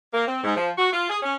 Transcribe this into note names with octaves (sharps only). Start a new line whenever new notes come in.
A#3
C4
G#2
F3
F#4
F4
G#4
C#4